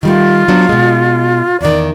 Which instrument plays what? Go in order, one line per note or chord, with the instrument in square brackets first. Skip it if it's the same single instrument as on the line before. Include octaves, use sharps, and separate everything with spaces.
[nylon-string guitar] D#3 G3 A3 [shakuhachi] F4
[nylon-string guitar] F#3 B3 D4
B2 G#3
[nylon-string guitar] E2 D#3 [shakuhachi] D5